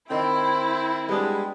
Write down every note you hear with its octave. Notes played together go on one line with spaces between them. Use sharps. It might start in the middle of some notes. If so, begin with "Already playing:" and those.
D#3 C4 E4 D5 G5
G3 G#3 B3 D4